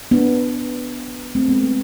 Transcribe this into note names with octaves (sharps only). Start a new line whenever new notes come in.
B3 D4
A3 C4
G#3 B3
A3